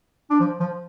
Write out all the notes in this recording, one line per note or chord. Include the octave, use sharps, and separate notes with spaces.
D4
F3
F3